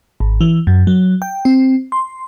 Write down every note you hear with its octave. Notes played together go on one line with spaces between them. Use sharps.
G#1
E3
F#2
F#3
G5
C4
C6